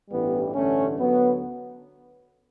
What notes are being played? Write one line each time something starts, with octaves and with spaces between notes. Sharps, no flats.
A1 G2 E3 G3 B3
A1 G2 D3 A3 C#4
D2 D3 F#3 B3